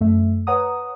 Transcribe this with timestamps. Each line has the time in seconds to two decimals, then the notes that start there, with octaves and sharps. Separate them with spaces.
0.01 F#2 A3 E5
0.47 B4 C#5 F#5 A#5 D#6